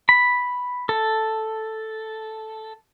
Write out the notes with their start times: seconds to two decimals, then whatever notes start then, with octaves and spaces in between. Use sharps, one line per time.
0.09 B5
0.89 A4